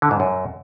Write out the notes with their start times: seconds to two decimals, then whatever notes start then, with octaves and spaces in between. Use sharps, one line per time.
0.02 D3
0.11 G#2
0.20 F#2